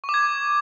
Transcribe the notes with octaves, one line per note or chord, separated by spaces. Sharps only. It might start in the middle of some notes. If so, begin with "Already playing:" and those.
C#6
D6
G#6